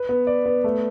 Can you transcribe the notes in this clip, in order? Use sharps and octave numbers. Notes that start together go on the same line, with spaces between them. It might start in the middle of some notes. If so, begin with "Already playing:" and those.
Already playing: B4
B3
D5
B3
A3